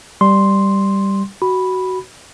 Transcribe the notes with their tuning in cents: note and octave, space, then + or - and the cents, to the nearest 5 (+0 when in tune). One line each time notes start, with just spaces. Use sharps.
G3 +0 C6 +0
F#4 +10 B5 +0